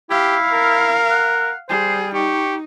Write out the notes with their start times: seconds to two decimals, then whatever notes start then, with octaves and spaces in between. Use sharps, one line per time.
0.10 E4 G4 F5
0.53 A#4
1.10 F#5
1.70 G3 G#4 C5
2.14 D#4 G4 C#6